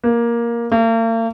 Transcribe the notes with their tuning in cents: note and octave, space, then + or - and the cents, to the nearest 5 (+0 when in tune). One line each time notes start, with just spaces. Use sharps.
A#3 +10
A#3 -45